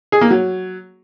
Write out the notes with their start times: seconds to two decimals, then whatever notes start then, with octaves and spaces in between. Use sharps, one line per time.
0.12 G#4
0.21 A#3
0.30 F#3